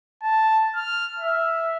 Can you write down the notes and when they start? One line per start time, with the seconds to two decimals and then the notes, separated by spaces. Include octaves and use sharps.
0.23 A5
0.76 F6
1.19 E5